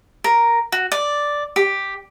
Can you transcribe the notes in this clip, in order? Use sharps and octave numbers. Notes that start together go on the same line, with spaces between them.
A#4
F#4
D5
G4